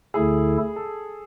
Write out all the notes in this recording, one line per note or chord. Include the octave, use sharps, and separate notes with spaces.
D2 D3 A3 E4 G#4 A4
A4